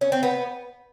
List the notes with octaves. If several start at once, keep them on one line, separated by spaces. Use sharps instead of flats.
C#4
C4
B3